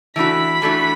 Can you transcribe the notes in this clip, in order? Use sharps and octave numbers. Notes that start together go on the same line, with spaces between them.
E3 A3 D4 F#4 B5
E3 A3 D4 F#4